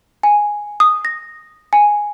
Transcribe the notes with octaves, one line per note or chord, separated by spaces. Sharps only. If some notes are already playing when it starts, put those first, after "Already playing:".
G#5
D#6
A#6
G#5